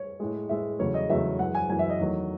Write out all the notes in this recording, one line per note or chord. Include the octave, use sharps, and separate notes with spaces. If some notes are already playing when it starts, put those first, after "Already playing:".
Already playing: C#5
A2 G#3
A2 G#3 E5
E2 C#3 F#3 A3 C#5
D#5
E2 C#3 F#3 A3 E5
F#2 E3 G#3 F#5
G#5
F#2 E3 G#3 G#5
E5
D#5
E2 D#3 F#3 A3